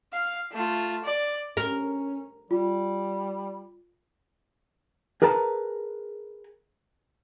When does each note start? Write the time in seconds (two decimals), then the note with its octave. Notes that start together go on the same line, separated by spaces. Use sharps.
0.12 F5
0.52 A3 F4
1.04 D5
1.57 C#4 A#4
2.51 G3 F4
5.22 G#4 A#4 B4 A5 A#5